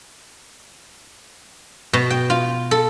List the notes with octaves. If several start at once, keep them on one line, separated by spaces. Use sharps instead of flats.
B2
G5
F4
A4